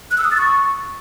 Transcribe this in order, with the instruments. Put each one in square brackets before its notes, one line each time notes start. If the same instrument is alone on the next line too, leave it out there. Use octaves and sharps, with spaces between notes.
[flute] F#6
E6
D#6
A6
C#6